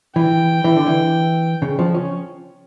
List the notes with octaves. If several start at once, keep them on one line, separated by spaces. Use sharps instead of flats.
E3 G5
E3
D3
E3
C#3
F3
C#4